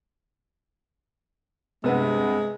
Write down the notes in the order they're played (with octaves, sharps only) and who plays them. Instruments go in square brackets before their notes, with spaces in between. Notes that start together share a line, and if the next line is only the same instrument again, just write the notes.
[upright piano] G2 B4 E6 [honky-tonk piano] C3 B3 [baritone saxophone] G#3